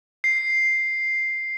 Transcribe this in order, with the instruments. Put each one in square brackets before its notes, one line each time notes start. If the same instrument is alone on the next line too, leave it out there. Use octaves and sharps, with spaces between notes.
[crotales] C7